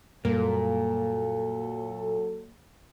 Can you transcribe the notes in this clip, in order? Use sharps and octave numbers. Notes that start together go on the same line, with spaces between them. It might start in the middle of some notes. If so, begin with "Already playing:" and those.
F#2 A#2 F#3 G3 A#3 A4